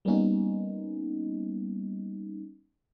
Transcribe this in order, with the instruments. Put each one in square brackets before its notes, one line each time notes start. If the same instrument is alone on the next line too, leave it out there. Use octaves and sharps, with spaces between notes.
[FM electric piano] G3 A#3 B3 C#4 D#4 F#4